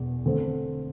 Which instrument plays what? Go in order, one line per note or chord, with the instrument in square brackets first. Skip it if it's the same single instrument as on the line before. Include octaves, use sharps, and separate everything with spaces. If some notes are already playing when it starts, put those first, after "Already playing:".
Already playing: [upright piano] E1 E2
D3 A3 C4